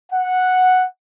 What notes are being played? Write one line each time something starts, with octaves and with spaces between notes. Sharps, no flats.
F#5